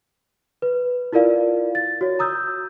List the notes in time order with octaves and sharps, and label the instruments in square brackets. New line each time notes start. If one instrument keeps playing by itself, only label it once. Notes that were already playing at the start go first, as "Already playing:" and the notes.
[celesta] B4
E4 F4 A#4 D5 F5
A6
F#4 C#5
A#5 D#6 E6 G6